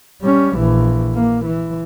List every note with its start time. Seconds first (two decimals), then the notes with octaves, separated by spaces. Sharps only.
0.23 G3 C#4
0.57 A#1 E3
1.15 A#3
1.45 E3